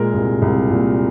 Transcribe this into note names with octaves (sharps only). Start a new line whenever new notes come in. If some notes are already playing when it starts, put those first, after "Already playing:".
Already playing: A#2 G#3 A#4
C2
C2
A#2